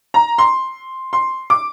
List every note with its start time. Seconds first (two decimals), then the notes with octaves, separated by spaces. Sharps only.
0.14 A#5
0.38 C6
1.13 C6
1.50 D6